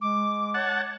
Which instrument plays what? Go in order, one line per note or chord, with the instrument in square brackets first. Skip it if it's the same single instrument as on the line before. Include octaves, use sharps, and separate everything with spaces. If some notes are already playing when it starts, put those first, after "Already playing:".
[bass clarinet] G#3 [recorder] D6
[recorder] C#5 [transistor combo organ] F#5 A5